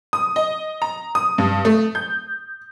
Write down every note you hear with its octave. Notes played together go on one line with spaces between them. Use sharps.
D#6
D#5
A#5
D#6
G2
A3
G6